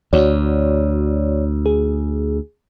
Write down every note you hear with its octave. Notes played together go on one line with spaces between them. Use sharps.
D2 F#4 C#5 D5
G#4